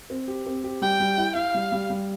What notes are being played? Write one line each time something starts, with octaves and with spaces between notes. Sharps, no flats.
C4
G4
C4
G4
G3 G5
G3
E4
E4 F5
G3
G3
G3